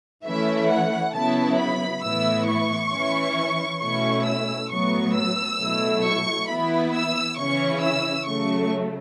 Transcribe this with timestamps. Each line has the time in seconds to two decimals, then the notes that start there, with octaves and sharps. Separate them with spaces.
0.25 E3 A3 C#4 E4 E5
0.69 F#5
1.13 C#3 F#3 B3 E4 A5
1.58 B5
2.03 A2 E3 B3 E4 E6
2.48 C#6
2.92 E3 C#4 E4
3.81 B2 A3 C#4 E4 C#6
4.25 E6
4.71 A2 F#3 B3 C#6
5.16 E6
5.59 B2 F#3 A3 E4
6.04 C#6
6.49 E3 B3 E4 B5
6.94 E6
7.37 C#3 E3 C#4 E4 C#6
7.82 E6
8.27 C#3 F#3 A3 C#6